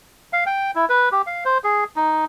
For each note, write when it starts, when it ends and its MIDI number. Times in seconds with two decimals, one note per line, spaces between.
0.33 0.44 77
0.46 0.71 79
0.75 0.85 64
0.89 1.09 71
1.12 1.22 67
1.27 1.44 77
1.45 1.58 72
1.64 1.84 68
1.96 2.25 63